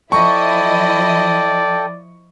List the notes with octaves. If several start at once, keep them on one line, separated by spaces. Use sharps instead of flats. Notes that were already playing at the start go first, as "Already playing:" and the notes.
F3 E4 A4 D5 D#5 G5 C#6